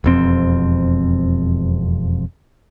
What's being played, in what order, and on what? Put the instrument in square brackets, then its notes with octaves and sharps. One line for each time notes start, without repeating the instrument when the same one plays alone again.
[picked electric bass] E1 F2 C4